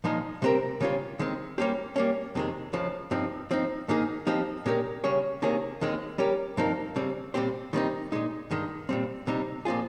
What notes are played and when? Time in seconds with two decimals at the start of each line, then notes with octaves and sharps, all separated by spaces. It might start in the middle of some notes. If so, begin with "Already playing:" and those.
0.04 A#2 F3 G#3 D#4 G#4
0.42 C3 G3 C4 G4 A#4
0.80 C#3 G3 C#4 F4 C5
1.19 D#3 G#3 C4
1.58 G3 A#3 C#4 G4 C5
1.96 G3 A#3 C#4
2.35 F2 C3 D#3 G#3
2.73 C#2 C#3 F3
3.11 G2 F3 C4 D#4
3.51 F3 C4 D#4
3.88 G#2 D#3 A#3 D#4 G#4
4.27 F3 C4 D#4 G4
4.66 A#2 G#3 C#4 G4 A#4
5.04 C#3 G3 C#4 G#4 C#5
5.42 C3 D#3 A#3 C#4 G#4
5.81 D#2 D#3 G#3 C4
6.18 G3 C#4 G4 A#4
6.57 G2 F3 C4 D#4 A#4
6.96 C#3 G3 C4
7.34 A#2 G3 C4 G4 C5
7.73 D#3 G3 C4 D#4
8.12 A#2 G#3 D#4
8.51 G2 D#3 G#3
8.89 A#2 G3 C4
9.27 C3 G3 C4 D#4
9.65 A#2 F3 C4 F4 G#4